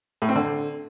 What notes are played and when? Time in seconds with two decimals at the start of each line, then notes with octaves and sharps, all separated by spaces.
0.22 A2
0.29 C4
0.36 D3